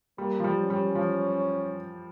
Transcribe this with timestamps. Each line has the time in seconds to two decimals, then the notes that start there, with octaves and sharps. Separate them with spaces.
0.18 G3 A#3
0.40 F3
0.44 G3
0.57 C#4
0.70 G3
0.95 F3